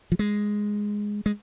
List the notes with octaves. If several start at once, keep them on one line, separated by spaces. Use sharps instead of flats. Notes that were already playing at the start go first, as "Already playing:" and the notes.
F3
G#3
G#3